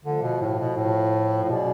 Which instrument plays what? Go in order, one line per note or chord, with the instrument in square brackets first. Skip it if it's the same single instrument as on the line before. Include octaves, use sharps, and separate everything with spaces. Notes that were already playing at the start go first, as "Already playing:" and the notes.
[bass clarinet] D3 [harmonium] F3 A3 F4
[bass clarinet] B2
A2
B2
A2
A2
[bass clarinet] B2 [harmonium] F#3 C#4 G#4 D5